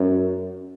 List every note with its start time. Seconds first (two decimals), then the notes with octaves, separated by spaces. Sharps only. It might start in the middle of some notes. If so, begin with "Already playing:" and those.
Already playing: F#2